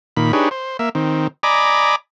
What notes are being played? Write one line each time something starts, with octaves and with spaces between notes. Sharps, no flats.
A#2 D#3 B5
D4 D#4 G4 G#4 B4 C#5
C5
A#3 E5
D#3 C4
D5 D#5 G#5 A#5 B5 D6